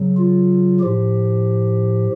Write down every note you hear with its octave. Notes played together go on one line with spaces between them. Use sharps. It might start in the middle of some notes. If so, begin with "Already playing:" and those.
Already playing: C#3 F#3
F4
A2 F3 G4